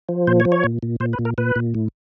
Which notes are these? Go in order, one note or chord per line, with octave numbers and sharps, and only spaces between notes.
F3
A#2 C5
C#5
F3
C#5
A#2
A#2
A#2 C5
B4
A#2
A#4
A#2 B4
A#2
A2